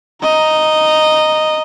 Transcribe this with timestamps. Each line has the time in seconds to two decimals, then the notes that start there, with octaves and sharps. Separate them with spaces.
0.23 D#5 A#5